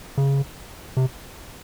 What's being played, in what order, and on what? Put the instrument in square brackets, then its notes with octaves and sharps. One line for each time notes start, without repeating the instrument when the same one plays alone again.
[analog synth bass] C#3
C3